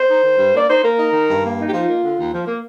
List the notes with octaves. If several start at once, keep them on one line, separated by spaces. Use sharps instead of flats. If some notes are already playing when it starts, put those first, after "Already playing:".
Already playing: C5
D#4
D#3
G2
A#3 D5
D#4 C5
A#3 A#4
D#4
D#3
G2
A#3
D#4
G4
F3 F4
A#3
D3
D#2
F3
A#3